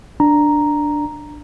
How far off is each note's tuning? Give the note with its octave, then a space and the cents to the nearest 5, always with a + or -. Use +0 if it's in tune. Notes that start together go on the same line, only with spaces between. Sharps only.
D4 +0 A#5 +0